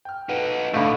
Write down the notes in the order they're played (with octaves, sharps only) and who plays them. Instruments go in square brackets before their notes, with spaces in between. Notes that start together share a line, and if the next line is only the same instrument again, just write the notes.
[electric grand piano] G5 F6
[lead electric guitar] D#4 A4 [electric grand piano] B4 F#5
[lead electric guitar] A2 [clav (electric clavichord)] D3 A3 [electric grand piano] F5 B5